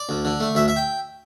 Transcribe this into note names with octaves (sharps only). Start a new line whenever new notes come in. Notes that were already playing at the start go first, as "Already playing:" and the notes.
Already playing: D5
D2
D3
A3
D2 E5
E5
G5